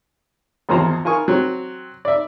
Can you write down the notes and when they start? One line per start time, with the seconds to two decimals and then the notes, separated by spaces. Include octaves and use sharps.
0.69 G#1 E2 F3 C5 A#5
1.05 F4 A#4 G#5 C#6 D#6
1.28 F#3 C4
2.05 D5 E5